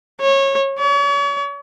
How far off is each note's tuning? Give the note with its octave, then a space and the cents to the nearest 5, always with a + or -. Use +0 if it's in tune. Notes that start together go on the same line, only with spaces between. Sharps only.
C#5 -25
C#5 +40